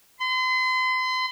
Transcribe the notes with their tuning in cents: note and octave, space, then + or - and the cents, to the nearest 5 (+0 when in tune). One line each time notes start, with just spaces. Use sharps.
C6 -40